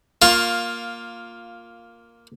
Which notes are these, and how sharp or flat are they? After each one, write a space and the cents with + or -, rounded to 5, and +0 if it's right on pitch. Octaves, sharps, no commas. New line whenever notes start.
A#3 +0 F4 +10 C#6 -45